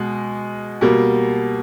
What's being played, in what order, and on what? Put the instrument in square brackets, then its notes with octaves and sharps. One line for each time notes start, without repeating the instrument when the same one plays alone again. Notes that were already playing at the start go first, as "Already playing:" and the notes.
Already playing: [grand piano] B2 G#3
B2 G3 A#3